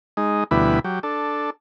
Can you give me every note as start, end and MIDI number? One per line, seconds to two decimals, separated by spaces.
0.17 0.44 56
0.17 0.44 63
0.51 0.79 38
0.51 0.79 47
0.51 0.79 52
0.51 0.79 55
0.51 0.79 64
0.51 0.79 83
0.84 0.99 54
0.84 0.99 67
1.03 1.50 62
1.03 1.50 69